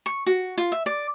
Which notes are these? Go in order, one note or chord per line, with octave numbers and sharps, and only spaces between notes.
C#6
F#4
F4
E5
D5